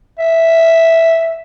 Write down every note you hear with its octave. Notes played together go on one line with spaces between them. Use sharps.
E5